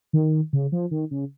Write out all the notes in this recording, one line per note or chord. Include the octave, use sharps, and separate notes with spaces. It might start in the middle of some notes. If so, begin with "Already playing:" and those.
D#3
C#3
F3
D#3
C#3